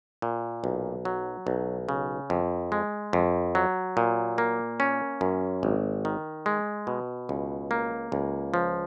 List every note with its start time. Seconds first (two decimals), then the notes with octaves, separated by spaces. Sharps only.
0.22 A#2
0.64 B1
1.05 F#3
1.47 B1
1.89 C#3
2.30 F2
2.72 G#3
3.13 F2
3.55 F#3
3.97 A#2
4.38 A#3
4.80 C#4
5.21 F#2
5.63 G#1
6.05 D#3
6.46 G#3
6.87 B2
7.29 C#2
7.71 A#3
8.12 C#2
8.54 F3